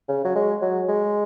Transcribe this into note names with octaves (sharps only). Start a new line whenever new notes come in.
C#3
F#3
G#3
F#3
G#3